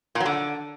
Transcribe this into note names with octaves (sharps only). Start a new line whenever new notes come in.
A#2
F#3
D3